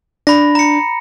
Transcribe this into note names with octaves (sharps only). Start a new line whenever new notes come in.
D4 B5 A#6
A#5 C#7